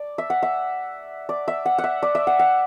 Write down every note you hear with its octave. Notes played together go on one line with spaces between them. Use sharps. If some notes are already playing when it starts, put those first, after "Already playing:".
Already playing: D5
E5
F#5
E5
D5
E5
F#5
F#5
E5
D5
E5
F#5
F#5